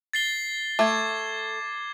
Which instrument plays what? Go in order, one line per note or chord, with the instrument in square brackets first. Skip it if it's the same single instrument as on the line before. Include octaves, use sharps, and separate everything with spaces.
[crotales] A6 C7 G7
[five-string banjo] A3 [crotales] D6 G#6